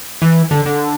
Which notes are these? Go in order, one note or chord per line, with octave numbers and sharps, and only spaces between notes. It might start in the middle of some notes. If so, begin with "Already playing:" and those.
E3
D3
D3